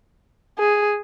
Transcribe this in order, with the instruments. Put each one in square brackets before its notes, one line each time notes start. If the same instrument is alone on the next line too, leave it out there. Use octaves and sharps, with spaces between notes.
[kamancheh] G#4